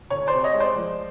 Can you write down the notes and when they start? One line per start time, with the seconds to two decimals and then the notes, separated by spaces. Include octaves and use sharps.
0.10 D2 C#5
0.27 C5 D5
0.33 C3
0.44 C#5 D#5
0.54 G#3
0.60 C5 D5
0.76 F3